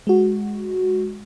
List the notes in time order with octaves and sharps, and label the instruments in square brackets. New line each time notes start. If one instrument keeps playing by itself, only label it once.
[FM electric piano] G#3 F#4